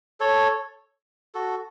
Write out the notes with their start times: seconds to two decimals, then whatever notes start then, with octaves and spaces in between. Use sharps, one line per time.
0.20 A4 C#5
1.35 F#4 A4